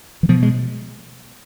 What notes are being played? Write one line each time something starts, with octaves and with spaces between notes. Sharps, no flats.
E3
B2 F3
G#3